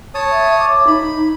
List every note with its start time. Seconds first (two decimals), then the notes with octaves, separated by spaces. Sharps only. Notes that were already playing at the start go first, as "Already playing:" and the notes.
0.14 C#5 A5 D#6
0.31 E5
0.59 D6
0.87 D#4 B5